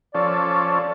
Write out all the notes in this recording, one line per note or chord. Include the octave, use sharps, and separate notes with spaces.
F3 C#4 A4 D5